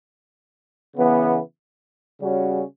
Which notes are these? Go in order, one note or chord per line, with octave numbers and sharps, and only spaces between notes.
C#3 E3 B3
C#3 G3 C#4 F#4